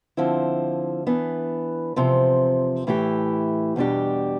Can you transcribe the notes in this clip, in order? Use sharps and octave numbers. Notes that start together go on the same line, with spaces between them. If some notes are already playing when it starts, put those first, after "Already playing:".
D3 F3 C4 E4
E3 B3 D4
E2 C3 F3 C4
A2 E3 A3 E4 G4
E2 B2 G3 D4 G4